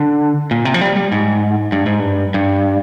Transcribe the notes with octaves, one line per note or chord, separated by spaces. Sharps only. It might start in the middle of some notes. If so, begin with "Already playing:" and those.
Already playing: D3
A#2
C3
F3
G3
G3
G#2
G2
G#2
G2
G2